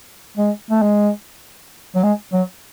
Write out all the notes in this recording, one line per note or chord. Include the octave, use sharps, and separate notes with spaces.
G#3
A3
G#3
F#3
G#3
F#3